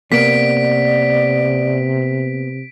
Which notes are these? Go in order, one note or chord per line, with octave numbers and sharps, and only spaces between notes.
C3 A#3 B3 D5 B6 D7